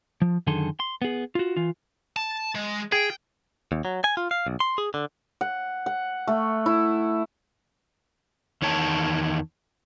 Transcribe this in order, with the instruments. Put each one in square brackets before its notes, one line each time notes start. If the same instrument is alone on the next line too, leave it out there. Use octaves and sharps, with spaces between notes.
[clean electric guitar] F3
F#2 D3 D#3 G#4 A4 C6
C6
B3 G#4
F4 F#4
E3 F4
[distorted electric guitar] A5
G#3
[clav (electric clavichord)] G#4 [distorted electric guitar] G5
[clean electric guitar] D#2
F#3
G#5
F4
F5
B1
C6
G#4
D3
[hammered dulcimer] F#5
F#5
A3
E4
[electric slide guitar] E2 D#3 C#5 A5